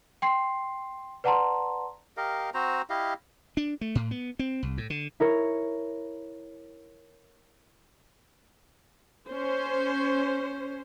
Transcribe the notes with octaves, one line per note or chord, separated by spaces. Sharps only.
G5 C6 C7
B4 D5 F#5 A5 A#5 C6
G4 A#4 D#5 F5
C4 F#4 C5 A#5
E4 G4 D#5 F5
D4
A3
A2
B3
C4
C2
A2
D3
E4 A#4 C#5
C#4 C5